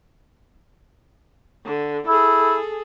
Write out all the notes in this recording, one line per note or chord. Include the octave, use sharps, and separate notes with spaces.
D3
E4 G#4 A4